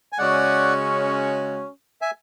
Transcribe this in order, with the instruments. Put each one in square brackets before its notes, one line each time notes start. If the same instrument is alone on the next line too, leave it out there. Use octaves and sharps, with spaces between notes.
[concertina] G#5
[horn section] C#3 G#3 C#4 F#4 [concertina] D5 F#5
[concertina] E5 G#5